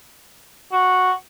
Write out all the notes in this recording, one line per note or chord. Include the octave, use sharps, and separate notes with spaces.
F#4